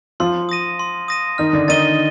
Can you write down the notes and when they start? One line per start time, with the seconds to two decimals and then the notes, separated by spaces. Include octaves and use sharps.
0.20 F3 F4 C6
0.49 D#6 A#6 D#7
0.79 C6
1.08 D#6 A#6 D#7
1.38 D#3 D#4 F6
1.53 D3 D4
1.68 D#3 D#4 A6 D#7 G7